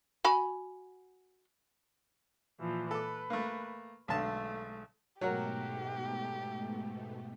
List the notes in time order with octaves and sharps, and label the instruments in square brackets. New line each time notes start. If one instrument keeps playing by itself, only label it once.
[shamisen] F#4 G#5 B5
[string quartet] A#2 E3 F3
[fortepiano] A4 D6 [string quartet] B4
[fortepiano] A3 A#3
[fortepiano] B1 D3 A5 [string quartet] G#3 A3
[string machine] G#2 B2 A3 [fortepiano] F#3 F#4 A#4 [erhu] G4